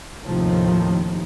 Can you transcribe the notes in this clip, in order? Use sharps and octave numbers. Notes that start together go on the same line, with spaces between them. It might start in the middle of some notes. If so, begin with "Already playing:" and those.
D#2 A2 C3 D#3 F3